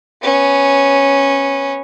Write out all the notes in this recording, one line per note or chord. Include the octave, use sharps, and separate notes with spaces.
B3 C#4